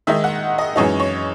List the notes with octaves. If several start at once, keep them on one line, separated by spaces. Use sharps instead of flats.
D#3 G#3 D#4 E5
F#5
D#5
F#2 E3 G#3 D#4 C#5
C#5